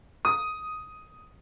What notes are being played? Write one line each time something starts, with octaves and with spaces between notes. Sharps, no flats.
D#6